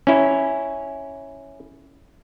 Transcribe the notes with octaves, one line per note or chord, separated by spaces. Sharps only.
C#4 E4